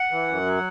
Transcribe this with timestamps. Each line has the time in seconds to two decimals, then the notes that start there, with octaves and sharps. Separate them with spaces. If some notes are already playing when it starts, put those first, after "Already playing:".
Already playing: F#5
0.11 E3
0.28 F#2
0.46 F#3